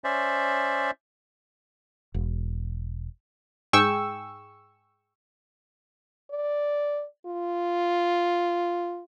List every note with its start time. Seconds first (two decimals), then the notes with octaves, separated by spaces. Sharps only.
0.04 C#4 C5 D5 E5
2.14 E1
3.73 G#2 G#4 G5 C#6 E6
6.31 D5
7.26 F4